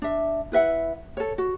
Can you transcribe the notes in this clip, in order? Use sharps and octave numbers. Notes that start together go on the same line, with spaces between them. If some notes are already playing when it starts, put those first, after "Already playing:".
D4 E5
E4 B4 E5 F#5
A4 C#5
F#4